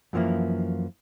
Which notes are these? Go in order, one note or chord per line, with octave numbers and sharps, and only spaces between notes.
F#2 E3 F3 G3 A#3 E4